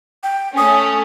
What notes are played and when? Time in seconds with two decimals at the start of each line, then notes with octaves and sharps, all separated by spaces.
0.23 G5
0.57 A3 C#4 D#6